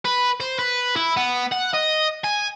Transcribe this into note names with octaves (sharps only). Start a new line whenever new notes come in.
B4
C5
B4
E4
B3
F#5
D#5
G#5